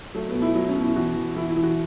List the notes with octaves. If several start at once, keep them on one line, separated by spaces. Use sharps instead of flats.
F#3 A3
B3
B2
E4
F#3 E4
C#4
B2
E4
E3 F#4
E3
E3 E4
E4
E3
F#4